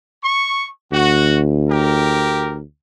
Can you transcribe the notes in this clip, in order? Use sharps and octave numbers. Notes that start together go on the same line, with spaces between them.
C#6
D2 F#4
G4 A#4